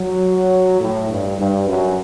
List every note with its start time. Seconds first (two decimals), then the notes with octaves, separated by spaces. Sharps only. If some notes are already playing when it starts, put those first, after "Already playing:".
Already playing: F#3
0.81 A2
1.10 G2
1.38 G2
1.67 F#2